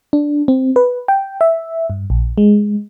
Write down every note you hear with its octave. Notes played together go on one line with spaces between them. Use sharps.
D4
C4
B4
G5
E5
G2
A#1
G#3